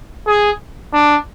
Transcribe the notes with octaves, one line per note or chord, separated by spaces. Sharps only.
G#4
D4